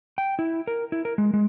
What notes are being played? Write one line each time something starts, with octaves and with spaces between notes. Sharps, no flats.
G5
E4
A#4
E4
A#4
G#3
G#3